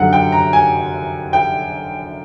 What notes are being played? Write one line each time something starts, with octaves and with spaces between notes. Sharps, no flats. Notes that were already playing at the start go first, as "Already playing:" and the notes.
Already playing: F#2 D3 F#3 F#5
G5
A#5
G#5
G5